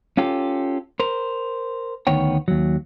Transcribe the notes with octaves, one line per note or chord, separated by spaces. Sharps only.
C#4 F4 G4 A4
A#4 C5
D2 D#3 B3 C#5 G5
D#2 F#3